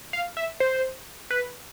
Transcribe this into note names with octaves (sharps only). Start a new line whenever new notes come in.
F5
E5
C5
B4